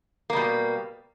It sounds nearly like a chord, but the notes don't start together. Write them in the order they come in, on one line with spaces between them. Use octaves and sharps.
A#3 B2 G3